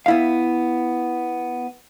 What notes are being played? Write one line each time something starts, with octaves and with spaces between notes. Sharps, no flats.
B3 E4 F5